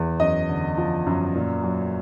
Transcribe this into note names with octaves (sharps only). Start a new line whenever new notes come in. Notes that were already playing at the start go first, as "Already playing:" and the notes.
Already playing: E2
F#2 D#5
D3
F3
F#2
A#2
F#3